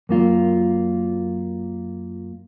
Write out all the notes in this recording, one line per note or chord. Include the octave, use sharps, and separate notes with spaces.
F#2 A#3 F4